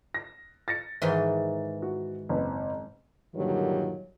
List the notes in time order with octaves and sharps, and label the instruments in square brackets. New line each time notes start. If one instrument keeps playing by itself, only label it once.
[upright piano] A#6
A6 A#6 C#7
[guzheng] G#2 D#3 E3
[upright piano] F#4
F#1 C4 B4
[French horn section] G2 A#2 D3 D#3 F#3 G3